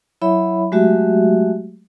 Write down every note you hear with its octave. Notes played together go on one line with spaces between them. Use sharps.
F#3 E4 C#5 E5 B5
F#3 G#3 A3 F#4 G4 E5